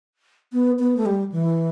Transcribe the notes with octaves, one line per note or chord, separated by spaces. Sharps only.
B3
B3
A3
G3
E3